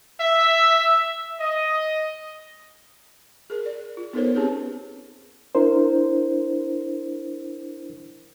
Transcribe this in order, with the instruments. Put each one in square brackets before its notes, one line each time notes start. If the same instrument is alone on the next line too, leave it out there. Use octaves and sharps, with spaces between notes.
[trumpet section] E5
D#5
[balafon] G#4 A#4
D5
F4
B3 D#4 A4 A#4 C5 C#5
C4 C#4 G4 G#4 B4
[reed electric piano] D4 E4 A#4 C5